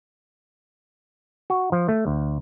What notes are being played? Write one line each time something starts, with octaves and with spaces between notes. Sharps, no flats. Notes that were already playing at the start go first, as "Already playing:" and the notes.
F#4
F3
A3
D2